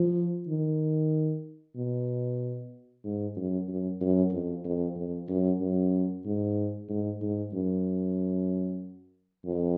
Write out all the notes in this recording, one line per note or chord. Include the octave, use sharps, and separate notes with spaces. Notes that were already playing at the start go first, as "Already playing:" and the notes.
Already playing: F3
D#3
B2
G#2
F#2
F#2
F#2
F2
F2
F2
F#2
F#2
G#2
G#2
G#2
F#2
F2